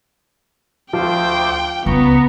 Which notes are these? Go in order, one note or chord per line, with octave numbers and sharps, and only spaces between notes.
D2 F3 C5 G5 D6
C#2 B3 A#5 C#6